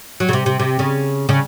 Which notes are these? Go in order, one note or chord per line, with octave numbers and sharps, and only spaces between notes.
F#3
C#3
C3
C3
C3
C#3
C#3